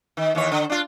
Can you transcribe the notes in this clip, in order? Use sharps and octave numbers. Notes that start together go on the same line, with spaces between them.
D#3
D#2 E3 C#5
D3
D4 F4